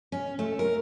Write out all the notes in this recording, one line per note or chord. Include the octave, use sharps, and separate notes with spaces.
C#4
A3
A#4